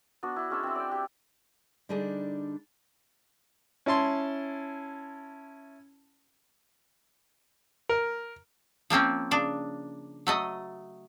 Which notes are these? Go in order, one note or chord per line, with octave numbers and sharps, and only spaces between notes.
B3 D4 F#4
D4 E4
G#3 C#4 D4 E5
C4 E4
D5 G5
G4
D3 G3 D4 D#4 G#4 D5
C#4 E4 A5 C6
A#4
F3 A#3 C4 C#4
C#3 D4
F#3 A3 D#5